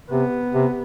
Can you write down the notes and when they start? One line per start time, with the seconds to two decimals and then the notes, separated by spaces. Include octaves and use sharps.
0.10 C3 B3
0.53 C3